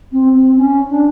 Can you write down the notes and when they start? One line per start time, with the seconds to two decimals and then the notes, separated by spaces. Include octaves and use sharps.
0.12 C4
0.34 C4
0.56 C#4
0.89 D4